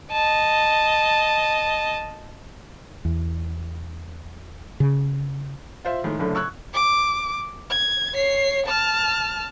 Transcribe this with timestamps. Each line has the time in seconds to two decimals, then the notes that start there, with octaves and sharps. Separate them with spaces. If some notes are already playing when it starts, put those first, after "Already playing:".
0.12 D#5 A5
3.05 E2
4.80 C#3
5.85 F4 C5 E5
6.04 A2 D#3 G#3
6.19 F#1 A2 D3
6.35 C#6 E6 F#6 G#6
6.74 D6
7.70 G#6
8.14 C#5 C7
8.66 A5 F6